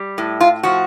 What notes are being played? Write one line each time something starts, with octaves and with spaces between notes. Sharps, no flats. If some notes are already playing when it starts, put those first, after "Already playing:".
Already playing: G3
A2
F4
F3 F#4